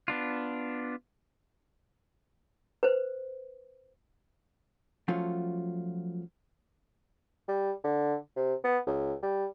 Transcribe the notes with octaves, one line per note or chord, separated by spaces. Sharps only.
B3 D4 F4
B4 C5
F3 F#3 A3 C#4 F4
G3
D3
C3
B3
C#2
G3